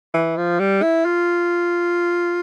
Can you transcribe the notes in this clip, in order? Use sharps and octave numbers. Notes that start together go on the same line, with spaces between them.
E3
F3
G3
E4
F4